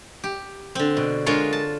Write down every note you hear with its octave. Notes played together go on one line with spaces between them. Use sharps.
G4
D3 C4
B2
D3 G#3 F4 A#4 C#5 C6
A5